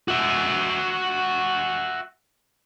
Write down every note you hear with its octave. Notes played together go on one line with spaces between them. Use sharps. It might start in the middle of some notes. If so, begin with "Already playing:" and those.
F#4 E5